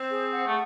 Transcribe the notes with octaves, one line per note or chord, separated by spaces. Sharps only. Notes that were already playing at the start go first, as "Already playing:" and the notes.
Already playing: C4 C5
G#4
F#5
A3